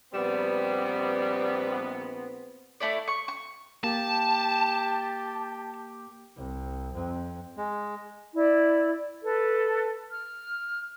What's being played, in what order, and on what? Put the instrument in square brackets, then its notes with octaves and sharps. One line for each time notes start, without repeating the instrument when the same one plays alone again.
[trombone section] A#1 B3 [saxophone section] G3 [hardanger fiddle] C4 [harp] B4 C#7 E7
[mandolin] A3 E4 D5
C#6
C#6
[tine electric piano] A#3 [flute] G4 [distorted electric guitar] A5
[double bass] C2
F2
[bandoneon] G#3
[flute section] E4 D5
A4 B4
F6